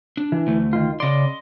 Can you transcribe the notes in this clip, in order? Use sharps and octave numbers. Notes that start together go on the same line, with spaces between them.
D4
E3
D2 A3
D#3 F4
C#3 D5 D#5 C6